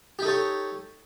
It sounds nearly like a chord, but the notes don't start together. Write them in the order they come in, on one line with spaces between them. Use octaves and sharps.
G4 D#4 A4 C#5